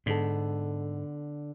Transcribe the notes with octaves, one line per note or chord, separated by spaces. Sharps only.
G#2 D3 B3 A4